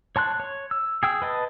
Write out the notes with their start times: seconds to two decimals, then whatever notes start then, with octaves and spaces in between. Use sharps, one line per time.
0.16 C#5 A5 C6 F#6
0.40 C#5
0.71 E6
1.03 G#4 G5 E6
1.22 B4 D#5 A5